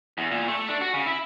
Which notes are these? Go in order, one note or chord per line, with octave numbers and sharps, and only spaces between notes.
E2
A#2
A3
D4
F#4
C#3
E4